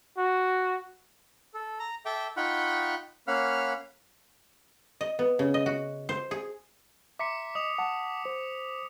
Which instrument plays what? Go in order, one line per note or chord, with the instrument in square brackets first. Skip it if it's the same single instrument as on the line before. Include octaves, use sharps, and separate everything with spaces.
[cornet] F#4
[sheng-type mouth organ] A4
A#5
A4 E5 G5 D6
D#4 F4 F#5 G5 B5 C#6
A#3 C#4 F5 F#5 B5 F6
[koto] D#5
B3
C#3
D#5
F#4
C5
G#4
[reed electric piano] E5 A#5 C6 [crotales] D6 B6 C#7
[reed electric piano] D#5 [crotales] D#6 F7
[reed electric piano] F#5 A5
C5